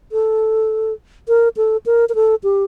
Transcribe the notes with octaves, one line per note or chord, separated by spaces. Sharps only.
A4
A#4
A4
A#4
A#4
A4
G4